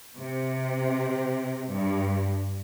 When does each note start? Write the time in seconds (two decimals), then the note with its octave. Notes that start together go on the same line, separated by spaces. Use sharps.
0.19 C3
1.71 G2